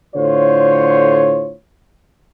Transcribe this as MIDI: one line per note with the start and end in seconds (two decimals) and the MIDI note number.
0.15 1.52 45
0.15 1.52 50
0.15 1.52 65
0.15 1.52 72
0.15 1.52 73